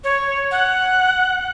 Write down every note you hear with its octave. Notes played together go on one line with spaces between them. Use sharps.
C#5
F#5